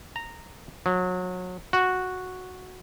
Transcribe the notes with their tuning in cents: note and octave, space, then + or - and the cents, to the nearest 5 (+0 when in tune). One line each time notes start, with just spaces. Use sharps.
A#5 -10
F#3 -30
F#4 -5